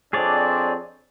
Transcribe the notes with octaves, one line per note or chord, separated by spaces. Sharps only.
F2 C4 D4 G#4 C#5 D5